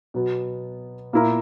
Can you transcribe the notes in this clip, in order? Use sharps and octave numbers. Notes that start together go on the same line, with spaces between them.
B2 F#3 B3
A#2 A#3 E4 A#4